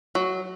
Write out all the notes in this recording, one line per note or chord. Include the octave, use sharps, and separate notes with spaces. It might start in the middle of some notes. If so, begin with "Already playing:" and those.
F#3